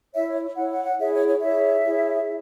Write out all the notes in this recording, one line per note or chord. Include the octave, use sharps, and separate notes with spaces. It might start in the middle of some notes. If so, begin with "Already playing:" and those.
E4 C#5 E5
C#5
E4 C#5 F#5
F#5
F#5
E4 G#4 C#5 E5
C#5
C#5
E4 G#4 C#5 E5
E4 G#4 C#5